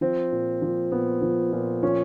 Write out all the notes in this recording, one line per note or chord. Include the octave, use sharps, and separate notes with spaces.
F3 C4
A#2
F3
A#2 B3
F3
A#2
F3 C#4